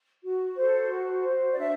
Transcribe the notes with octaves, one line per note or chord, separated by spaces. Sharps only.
F#4
A4 C5
F#4
C5
D5
D4 E5